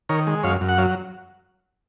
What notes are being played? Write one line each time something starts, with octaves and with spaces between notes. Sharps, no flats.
D#3 A#4 C#5
G#3
F#2 C#5 F5
F#2
F#5
F#3 C#5 F5